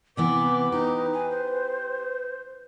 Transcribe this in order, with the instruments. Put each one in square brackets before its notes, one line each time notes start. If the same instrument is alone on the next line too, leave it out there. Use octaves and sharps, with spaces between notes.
[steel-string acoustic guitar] C3 E3 B3 [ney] B4 [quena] D6
[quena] D#4 [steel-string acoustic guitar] G4
[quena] G#5
C5